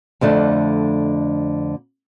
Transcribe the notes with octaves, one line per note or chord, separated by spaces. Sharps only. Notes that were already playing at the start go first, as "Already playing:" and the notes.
F2 D3 A3 D4